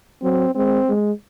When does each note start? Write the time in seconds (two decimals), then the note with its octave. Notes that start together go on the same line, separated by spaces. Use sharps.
0.22 F#3 C4
0.55 G#3 C4
0.89 G#3